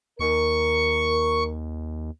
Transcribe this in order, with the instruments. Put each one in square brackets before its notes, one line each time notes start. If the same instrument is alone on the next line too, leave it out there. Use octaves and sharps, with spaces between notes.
[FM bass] D#2 [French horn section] A#4 [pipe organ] C#6